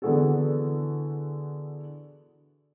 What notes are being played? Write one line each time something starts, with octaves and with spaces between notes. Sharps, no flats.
D3 E3 B3 F#4 G#4 A4